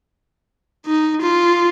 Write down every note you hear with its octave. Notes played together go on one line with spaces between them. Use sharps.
D#4
F4